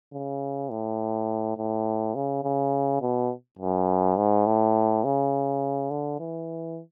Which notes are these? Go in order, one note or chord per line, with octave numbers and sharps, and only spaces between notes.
C#3
A2
A2
C#3
C#3
B2
F#2
G#2
A2
C#3
D3
E3